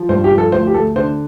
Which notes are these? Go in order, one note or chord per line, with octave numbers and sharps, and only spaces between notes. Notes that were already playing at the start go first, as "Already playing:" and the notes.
Already playing: F3
G2 C5
G4
F3
A4
D2 C5
G4
D2 A4
D3 C5